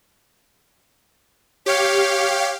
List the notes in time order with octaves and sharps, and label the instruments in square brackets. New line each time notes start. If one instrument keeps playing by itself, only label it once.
[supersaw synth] G4 F5 [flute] C#5